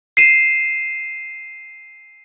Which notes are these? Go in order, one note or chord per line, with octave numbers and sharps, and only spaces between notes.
C7 D#7 E7